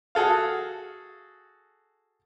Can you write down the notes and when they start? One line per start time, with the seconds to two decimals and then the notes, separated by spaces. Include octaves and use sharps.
0.15 F#4 G#4 A4 F5